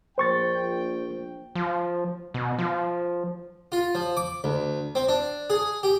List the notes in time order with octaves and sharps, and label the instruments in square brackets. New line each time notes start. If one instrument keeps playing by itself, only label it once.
[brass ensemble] A#1 G5 [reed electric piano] C5 C#6 A6
[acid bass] F3
B2
F3
[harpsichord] F4
F3
D6
D2
C4
D4
G#4
G4